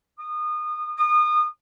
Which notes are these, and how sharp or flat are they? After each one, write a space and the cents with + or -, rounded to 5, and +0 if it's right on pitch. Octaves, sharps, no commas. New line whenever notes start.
D#6 -30
D#6 -30